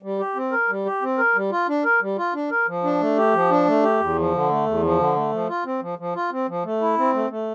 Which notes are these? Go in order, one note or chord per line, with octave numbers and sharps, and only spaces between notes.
G3
G4
C4
A#4
G3
G4
C4
A#4
G3
F4
D4
A#4
G3
F4
D4
A#4
F3
D4
A3
G4
F3
D4
A3
G4
E2
F3
D3
A3
E2
F3
D3
A3
F3
F4
C4
F3
F3
F4
C4
F3
A3
E4
C4
A3
A3